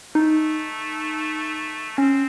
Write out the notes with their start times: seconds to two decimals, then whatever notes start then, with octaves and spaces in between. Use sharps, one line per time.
0.15 A3 D#4
1.98 C4 C#4